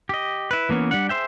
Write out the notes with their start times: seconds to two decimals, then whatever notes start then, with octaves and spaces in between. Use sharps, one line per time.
0.09 G4 D#5
0.51 E4 B4
0.69 E3 A#3 B3 C#4
0.91 G3 D4 F#5
1.09 G#4 C5 E5 G5